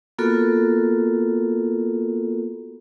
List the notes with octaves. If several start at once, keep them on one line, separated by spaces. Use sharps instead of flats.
A#3 B3 F4 F#4 A4 A#4